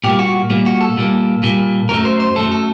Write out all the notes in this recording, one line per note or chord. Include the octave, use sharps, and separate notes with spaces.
A#2 G3 A#3 G4
F#4
A#2 G3 A#3
F#4
A4
A#2 G3 A#3
A#2 G3 A#3
F#2 F#3 A3 A#4
C5
C5
F#2 F#3 A3 A4
A4